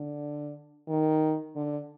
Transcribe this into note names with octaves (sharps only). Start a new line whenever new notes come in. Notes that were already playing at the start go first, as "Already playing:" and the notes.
Already playing: D3
D#3
D3